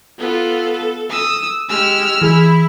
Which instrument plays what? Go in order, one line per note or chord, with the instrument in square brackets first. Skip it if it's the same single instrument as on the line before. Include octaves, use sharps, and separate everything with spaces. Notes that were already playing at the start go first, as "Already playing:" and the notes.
[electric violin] B3 F4 [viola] A4
[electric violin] D#6 E6
[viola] G#3 G4 [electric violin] E6 F6
[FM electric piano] E3 [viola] E4 [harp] G#4